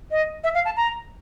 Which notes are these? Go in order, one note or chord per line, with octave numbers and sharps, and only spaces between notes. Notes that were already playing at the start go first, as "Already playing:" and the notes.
D#5
E5
F5
A5
A#5